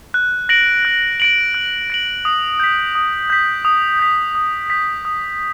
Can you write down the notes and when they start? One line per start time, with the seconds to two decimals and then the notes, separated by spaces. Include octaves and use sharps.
0.14 F#6
0.49 A#6 D7 F#7
0.85 F#6
1.20 A#6 D7 F#7
1.54 F#6
1.90 A#6 D7 F#7
2.25 D#6
2.60 G6 B6
2.95 D#6
3.30 G6 B6
3.65 D#6
3.99 G6 B6
4.35 D#6
4.70 G6 B6
5.05 D#6